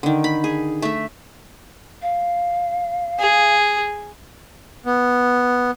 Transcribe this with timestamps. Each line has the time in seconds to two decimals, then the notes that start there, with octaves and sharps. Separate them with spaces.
0.03 D3 D#3
0.24 B5
0.44 G#4
0.82 A3 E5
2.02 F5
3.19 G#4
4.86 B3